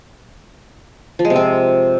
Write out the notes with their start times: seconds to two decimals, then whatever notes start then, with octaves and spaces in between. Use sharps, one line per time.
1.19 F3
1.25 G#3
1.30 C3
1.36 C4